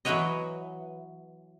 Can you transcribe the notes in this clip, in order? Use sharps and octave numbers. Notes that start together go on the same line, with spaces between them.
E3 F#3 B3 F#4 C#5 D#5